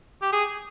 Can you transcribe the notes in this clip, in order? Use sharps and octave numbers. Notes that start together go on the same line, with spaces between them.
G4
G#4